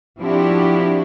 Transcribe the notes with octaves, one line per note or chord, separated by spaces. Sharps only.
F3 C4 D4 E4 F#4 G4